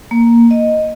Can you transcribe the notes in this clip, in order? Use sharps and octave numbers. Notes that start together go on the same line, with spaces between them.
A#3
D#5